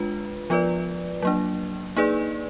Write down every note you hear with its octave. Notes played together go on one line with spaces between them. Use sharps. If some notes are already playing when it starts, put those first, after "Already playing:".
Already playing: G#3 D4 F4 B4
F3 B3 F4 B4 D5
F#3 A#3 D4
A#3 D#4 G#4 B4 D5